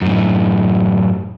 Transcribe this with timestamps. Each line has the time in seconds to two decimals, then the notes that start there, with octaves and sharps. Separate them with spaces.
0.02 F#2 A2